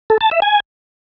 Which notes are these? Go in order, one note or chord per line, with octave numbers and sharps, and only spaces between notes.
A4
A5
E5
G#5